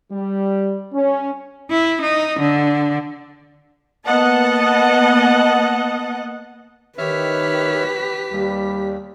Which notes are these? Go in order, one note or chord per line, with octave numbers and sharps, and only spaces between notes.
G3
C#4
E4
D#4
D3
A#3 B3 D#5 F#5 A5
D#3 G4 B4 C#5 E5 F6 B6
D#2 G3